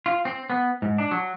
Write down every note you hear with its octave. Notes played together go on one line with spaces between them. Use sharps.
F4
C4
B3
G#2
D4
F#3